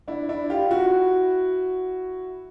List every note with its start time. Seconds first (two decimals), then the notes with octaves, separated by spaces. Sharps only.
0.08 D4 E4
0.29 D4 E4
0.50 F4 G4
0.71 E4 F#4